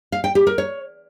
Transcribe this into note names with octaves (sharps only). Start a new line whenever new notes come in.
F5
G5
G4
A#4
C#5